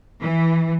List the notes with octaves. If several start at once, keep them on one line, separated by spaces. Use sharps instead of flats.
E3